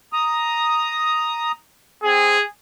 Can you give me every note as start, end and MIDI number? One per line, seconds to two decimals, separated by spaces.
0.13 1.52 82
0.13 1.52 87
2.03 2.38 60
2.03 2.44 68